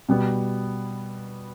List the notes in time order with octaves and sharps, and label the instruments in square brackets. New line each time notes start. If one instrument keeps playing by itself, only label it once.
[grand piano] B2 G3 B3